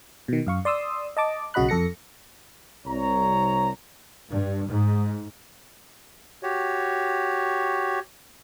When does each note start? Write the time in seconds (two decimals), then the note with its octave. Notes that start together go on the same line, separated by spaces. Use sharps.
0.28 B2 D#3
0.47 F#2 F5 C#6
0.65 D5 C6 D#6 E6
1.17 D#5 A5 D6
1.54 B1 C#3 F#4 D#5 B5 F#6
1.69 F2 A4 A#6 C#7
2.86 C2 C#5 A#5
4.29 G2
4.67 G#2
6.43 F#4 G4 C#5